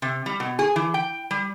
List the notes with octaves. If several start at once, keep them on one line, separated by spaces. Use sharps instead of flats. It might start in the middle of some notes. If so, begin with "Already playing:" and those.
C3
G3
B2
G#4
E3
G5
G3